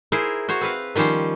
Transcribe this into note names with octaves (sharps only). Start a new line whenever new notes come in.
E4 G#4 A#4 C5
F#4 C5 C#5
C4 B4 F5
D#3 F3 G3 C#4 C5